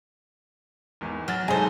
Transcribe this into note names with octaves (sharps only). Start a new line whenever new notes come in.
G#1 E2
F#3 F6 A6
G#2 D#4 G#4 A4 C5